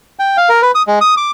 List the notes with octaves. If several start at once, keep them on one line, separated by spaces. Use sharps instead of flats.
G5
F5
A#4
B4
D#6
G#3
D#6
D6